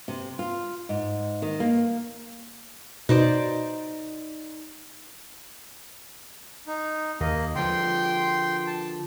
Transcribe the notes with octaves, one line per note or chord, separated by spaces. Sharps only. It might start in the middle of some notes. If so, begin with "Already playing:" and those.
C3
F4
G#2
D#3
A#3
B2 D#4 C5 D5
D#4
D#2 A#3 D#5
D3 F3 G5 C6
A5